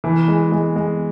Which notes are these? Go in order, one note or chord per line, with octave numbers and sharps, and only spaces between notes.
E3
G#3
G#3
G#3